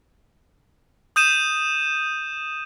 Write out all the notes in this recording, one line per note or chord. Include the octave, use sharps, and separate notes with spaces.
D#6 G6 D#7 E7